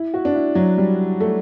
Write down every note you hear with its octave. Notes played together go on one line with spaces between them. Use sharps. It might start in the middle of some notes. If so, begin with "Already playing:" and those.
Already playing: E4
F#4
D4
E4
F#3
G3
A3